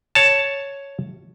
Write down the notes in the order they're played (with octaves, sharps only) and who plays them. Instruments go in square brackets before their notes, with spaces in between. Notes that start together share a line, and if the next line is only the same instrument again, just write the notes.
[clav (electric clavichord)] C#5 A5